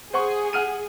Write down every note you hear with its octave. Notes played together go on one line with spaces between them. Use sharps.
G#4 C5 F#5 C#6
F#5 F6 D#7